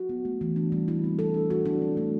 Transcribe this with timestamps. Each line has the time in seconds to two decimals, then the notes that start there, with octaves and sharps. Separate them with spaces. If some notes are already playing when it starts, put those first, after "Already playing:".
Already playing: F#4
0.09 B3
0.25 A3
0.41 E3
0.56 D4
0.72 G3
0.88 E4
1.04 C4
1.19 A4
1.34 D4
1.50 F#4
1.66 D4
1.82 C4
1.97 A3